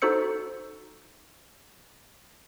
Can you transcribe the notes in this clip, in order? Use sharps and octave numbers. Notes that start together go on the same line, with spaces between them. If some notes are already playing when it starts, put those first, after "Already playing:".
D#4 F#4 A4 C5 E6 C#7